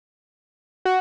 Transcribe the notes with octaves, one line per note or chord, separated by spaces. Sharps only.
F#4